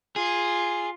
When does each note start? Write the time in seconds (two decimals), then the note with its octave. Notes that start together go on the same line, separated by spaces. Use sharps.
0.16 F4 G#4